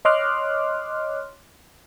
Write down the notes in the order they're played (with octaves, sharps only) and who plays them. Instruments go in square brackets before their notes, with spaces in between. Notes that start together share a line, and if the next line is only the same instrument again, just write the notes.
[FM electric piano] C#5 D#5 C6 D6 F6 F#6